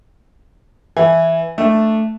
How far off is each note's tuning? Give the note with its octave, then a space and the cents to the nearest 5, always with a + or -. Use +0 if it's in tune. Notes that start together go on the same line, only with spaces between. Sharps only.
E3 +0 E4 +0 G#5 +0
A3 +0 D4 +10